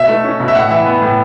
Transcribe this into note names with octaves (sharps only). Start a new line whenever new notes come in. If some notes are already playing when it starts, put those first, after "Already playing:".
Already playing: B2 E5
A3
C#4
B2
E5
A2 F#5
E3 E5
B3
A2